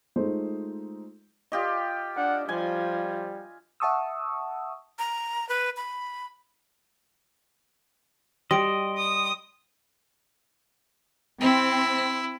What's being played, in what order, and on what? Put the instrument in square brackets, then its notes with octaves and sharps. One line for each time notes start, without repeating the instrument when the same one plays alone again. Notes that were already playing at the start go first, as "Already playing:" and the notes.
[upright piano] G#3 A3 D#4 F4 C5
[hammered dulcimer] F4 G4 D#5
[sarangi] D4 [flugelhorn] F#5
[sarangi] F3 [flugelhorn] G3 [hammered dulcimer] G#5
[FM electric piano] E5 F#5 A5 C#6 D#6 E6
[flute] A#5
B4
B5
[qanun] G3 [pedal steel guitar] D#5 [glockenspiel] C6 D7
[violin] D#6
[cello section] C4 [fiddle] E4